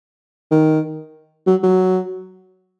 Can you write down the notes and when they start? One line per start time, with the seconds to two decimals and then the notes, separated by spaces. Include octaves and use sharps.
0.51 D#3
1.47 F#3
1.63 F#3